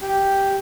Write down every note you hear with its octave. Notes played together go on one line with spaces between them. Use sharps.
G4